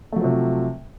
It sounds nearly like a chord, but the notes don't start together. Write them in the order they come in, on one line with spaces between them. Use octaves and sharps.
A3 F#3 F3 C3